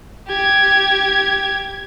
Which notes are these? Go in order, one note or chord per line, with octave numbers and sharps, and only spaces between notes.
G4 G#6